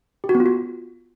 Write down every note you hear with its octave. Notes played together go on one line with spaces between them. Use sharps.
G4
F#4
B3
F4
F#4